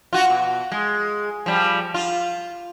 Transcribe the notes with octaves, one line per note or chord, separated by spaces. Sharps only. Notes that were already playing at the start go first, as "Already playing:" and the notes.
F4 F#4
B2
G#3
F3 G3
F4